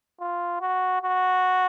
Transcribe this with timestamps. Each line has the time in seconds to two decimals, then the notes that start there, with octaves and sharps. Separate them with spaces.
0.20 F4
0.61 F#4
1.02 F#4